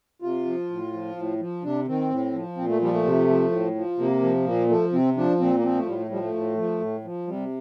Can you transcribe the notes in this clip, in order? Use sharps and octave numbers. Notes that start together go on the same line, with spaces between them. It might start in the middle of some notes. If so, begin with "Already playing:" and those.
C3 F4
F3
A2
F3
A2
F3
C3 D4
D#3 C4
A2
F3
A#2 C4
A3
F3 G3
A3
C3
F3
A2
F3
C3 A#3
F3
A#2 A#3
F3 A3
C3 C4
F3 D4
A#2 C4
A#3
F3 C4
A3
A2 G3
A3
F3 G3
A3
A2
F3
A2
F3
C3 G3